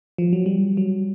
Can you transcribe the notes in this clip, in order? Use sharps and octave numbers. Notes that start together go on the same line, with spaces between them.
F3
F#3
G3
F#3